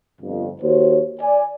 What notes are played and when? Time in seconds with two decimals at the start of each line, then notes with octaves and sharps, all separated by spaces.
0.22 G1 F2
0.61 D#2 F#4 C5 C#5
1.19 D5 G#5